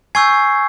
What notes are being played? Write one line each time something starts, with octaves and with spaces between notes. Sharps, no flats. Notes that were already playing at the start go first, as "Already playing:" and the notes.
G#5 C#6 E6 G6 G#6 C7